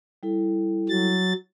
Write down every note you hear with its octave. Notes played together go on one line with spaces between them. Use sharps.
G3 E4 A4
F#3 A6